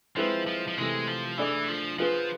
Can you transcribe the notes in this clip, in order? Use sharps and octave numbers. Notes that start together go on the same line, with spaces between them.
F3 G#3 C4 E4 B4
F3
F3
C3 E3 G#3 A3
F3
E3 A3 D4 G#4 D5
F3
F3 B3 F4 G#4 B4